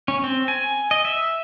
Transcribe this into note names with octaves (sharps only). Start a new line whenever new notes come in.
C#4
C4
G#5
D#5
E5